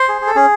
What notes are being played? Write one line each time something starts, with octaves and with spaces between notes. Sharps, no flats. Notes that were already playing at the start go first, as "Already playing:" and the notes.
Already playing: C5
G#4
G#4
A4
C#4 G#4